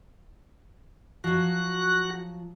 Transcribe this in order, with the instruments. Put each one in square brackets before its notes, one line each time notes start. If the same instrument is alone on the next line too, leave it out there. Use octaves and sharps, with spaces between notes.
[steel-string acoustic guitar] F3 F#3 [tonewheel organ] F#4 F#6